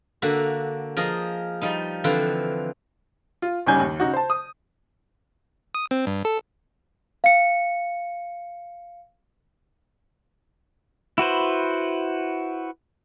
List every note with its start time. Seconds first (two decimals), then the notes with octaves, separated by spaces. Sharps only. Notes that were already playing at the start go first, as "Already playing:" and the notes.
0.22 D3 A#3 F#4 E5
0.97 F3 G#4 A#4 D#5
1.61 F3 G3 D#4
2.04 D3 E3 F3 C4 B4
3.42 F4
3.67 G1 C#3 G3 D#4 G#5 G6
3.80 D#2
4.00 C#3 D#4 F#4
4.14 C5 A5
4.30 D#6
5.75 D#6
5.91 C4
6.07 G2
6.25 A4
7.24 F5 C#7
11.18 E4 F#4 B4 C5